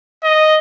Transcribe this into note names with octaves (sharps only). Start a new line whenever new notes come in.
D#5